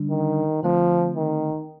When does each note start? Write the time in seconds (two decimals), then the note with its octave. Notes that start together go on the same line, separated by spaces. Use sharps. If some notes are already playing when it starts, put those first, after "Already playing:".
Already playing: D3 G3 D4
0.10 D#3
0.63 D3 F3 A3 C4
1.16 D#3